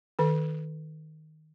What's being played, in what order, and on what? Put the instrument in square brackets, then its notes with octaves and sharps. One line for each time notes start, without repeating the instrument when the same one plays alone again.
[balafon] D#3 A4